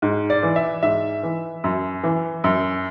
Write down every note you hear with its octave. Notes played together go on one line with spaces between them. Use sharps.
G#2
D5
E3
E5
G#2 E5
E3
F#2
E3
F#2